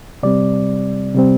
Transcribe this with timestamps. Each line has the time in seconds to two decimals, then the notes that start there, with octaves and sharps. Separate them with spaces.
0.23 C3 G3 C4 D5
1.14 C3 G3 C4